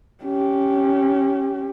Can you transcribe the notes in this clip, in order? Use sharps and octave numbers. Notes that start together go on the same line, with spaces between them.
C#4 G4